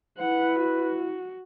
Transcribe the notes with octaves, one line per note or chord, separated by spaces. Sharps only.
E4 B4 F#5
F#4